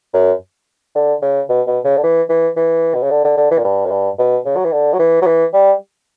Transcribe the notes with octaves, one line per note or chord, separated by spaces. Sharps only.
F#2
D3
C#3
B2
B2
C#3
D3
E3
E3
E3
B2
C#3
D3
D3
D3
E3
A#2
G2
F#2
G2
B2
C#3
F#3
E3
D3
F#3
E3
F#3
E3
G3